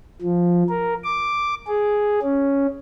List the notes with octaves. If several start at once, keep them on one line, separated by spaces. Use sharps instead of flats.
F3
A#4
D6
G#4
C#4